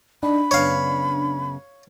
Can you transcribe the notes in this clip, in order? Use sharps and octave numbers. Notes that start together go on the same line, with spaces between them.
D4 D#4 G5 B5
F#2 C#3 B3 C#5 F5